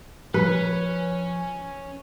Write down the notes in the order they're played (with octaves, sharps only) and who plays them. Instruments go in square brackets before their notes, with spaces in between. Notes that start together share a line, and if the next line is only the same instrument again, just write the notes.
[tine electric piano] F3 [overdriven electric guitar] C#4 [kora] B4